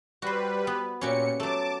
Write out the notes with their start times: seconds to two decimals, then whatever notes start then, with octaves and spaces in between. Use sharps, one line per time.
0.22 G3 F#4 B4 C5
0.67 B3
1.01 A#2 C#4 F#4 G4 C#7
1.40 F#3 A3 A5 D6